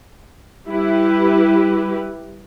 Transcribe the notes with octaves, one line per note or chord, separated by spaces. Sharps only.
G3 E4 G4 B4